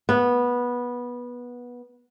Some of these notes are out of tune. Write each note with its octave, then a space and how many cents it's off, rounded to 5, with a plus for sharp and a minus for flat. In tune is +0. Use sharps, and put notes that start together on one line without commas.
B3 -15